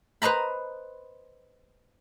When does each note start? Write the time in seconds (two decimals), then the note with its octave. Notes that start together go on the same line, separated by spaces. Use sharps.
0.22 B4 C5 D#5 A#5 B5